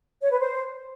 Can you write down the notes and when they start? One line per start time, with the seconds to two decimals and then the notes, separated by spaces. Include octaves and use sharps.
0.22 C#5
0.31 B4
0.40 C5